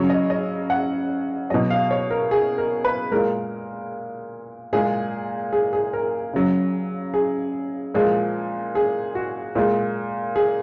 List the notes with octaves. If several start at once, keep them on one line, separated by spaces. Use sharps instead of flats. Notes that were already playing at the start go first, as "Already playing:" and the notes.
Already playing: C#3 F#3 C#5
D#5
D#5
F#5
B2 F#3 D#5
F5
C#5
A#4
G#4
A#4
B4
A#2 G#3 A#4
A#2 G#3 G#4
G#4
G#4
A#4
C#3 F#3
G#4
A#2 F3 G#3
G#4
F#4
A#2 G#3
G#4